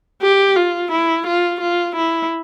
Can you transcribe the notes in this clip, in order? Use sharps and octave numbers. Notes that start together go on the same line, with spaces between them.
G4
F4
E4
F4
F4
E4